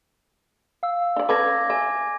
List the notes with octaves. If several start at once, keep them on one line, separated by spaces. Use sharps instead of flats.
F5 E6
D4 D5
C#4 A4 B4 D6 G#6 A#6
E5 G#5